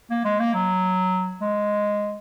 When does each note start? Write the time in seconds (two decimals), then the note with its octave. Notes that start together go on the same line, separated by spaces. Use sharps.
0.10 A#3
0.25 G#3
0.39 A#3
0.54 F#3
1.41 G#3